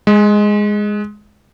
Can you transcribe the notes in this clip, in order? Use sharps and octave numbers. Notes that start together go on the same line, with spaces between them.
G#3